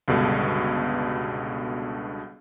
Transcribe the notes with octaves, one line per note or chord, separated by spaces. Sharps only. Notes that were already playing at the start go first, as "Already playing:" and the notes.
C#2 G2 B2 D3